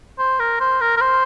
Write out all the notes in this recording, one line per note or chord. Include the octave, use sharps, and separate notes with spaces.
C5
A#4
C5
A#4
A#4
C5